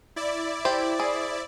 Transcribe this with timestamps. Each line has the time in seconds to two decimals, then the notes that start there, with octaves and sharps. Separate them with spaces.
0.16 E4 D5
0.65 G4 C5
0.99 G#4